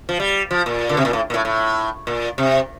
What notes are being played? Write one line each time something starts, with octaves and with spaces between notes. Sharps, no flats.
F3
G3
F3
A#2
D3
C3
A#2
A2
A#2
A2
A2
A#2
C3